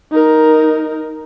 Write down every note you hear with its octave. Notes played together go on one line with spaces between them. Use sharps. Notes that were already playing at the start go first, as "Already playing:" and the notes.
D#4 A#4